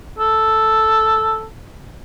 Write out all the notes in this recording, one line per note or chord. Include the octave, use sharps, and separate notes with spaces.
A4